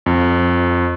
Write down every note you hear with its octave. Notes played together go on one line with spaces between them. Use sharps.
F2